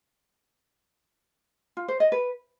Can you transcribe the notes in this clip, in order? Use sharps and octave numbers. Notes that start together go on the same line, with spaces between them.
F4
C5
D#5
B4